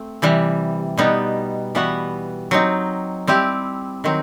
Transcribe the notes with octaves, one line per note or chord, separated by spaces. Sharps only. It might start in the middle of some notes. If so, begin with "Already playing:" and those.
Already playing: A3 C4
C3 E3 G3
B2 G3 B3 D#4
E3 G3 B3 F#4 B4
F#3 C4 D#4
G3 C4 E4 G4
D#3 F#3 C4